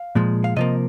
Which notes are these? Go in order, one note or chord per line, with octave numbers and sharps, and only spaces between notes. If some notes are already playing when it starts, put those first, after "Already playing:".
Already playing: F5
A#2 F3 G#3
F5
C3 F3 A#3 D#5